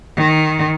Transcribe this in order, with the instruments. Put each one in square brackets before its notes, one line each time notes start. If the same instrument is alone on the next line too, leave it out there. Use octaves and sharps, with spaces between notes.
[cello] D#3